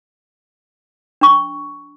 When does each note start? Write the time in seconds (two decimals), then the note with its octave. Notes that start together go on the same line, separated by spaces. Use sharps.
1.21 D4 C#6